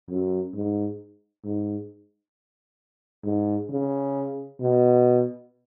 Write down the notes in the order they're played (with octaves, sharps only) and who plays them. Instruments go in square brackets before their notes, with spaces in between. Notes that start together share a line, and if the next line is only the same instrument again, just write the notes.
[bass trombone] F#2
G#2
G#2
G#2
C#3
B2